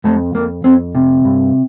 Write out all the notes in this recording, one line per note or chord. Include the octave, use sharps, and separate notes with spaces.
F2 A3
F2 A#3
F2 C4
C3
G2